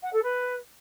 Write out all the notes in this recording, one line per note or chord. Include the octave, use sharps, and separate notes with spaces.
F#5
A4
B4